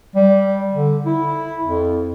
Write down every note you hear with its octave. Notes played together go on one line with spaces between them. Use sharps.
G3
D3
E4
F2